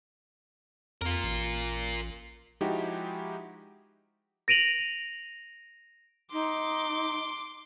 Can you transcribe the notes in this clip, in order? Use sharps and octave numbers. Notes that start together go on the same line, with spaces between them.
F2 F4 A#4
A1
F3 G#3 D#4 E4 F#4 G4
A#6 D7 D#7 F7 F#7
D#4 C6 D6